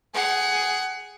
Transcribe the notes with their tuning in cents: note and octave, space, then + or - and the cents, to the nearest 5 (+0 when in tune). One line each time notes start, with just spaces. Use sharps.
G#4 +0 F#5 +20